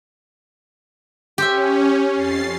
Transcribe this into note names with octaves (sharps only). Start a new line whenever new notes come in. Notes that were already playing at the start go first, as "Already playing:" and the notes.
C#4 G4 C5 E5
F2 A6 C7